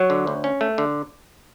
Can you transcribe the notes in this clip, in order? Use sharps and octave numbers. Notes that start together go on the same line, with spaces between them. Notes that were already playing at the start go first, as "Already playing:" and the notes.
Already playing: F#3 C#5
D3
D2
C#4
A3
D3